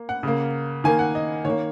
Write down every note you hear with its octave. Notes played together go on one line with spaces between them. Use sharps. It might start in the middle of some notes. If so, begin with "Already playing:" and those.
Already playing: A#3
F#5
C#3 A#3
D#3 A#3 G#5
F#5
D#5
D#3 C#5
A#3